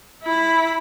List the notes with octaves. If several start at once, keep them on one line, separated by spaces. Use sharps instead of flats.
E4 B5